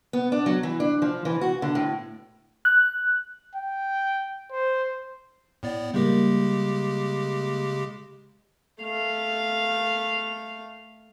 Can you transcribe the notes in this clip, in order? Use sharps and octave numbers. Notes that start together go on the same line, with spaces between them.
B3
D4
F#3
E3
D4
F3
E3
F#4
D3
A2
F#6
G5
C5
A2 B3 D5
C#3 G3 G#3 A#3 G4
A3 F5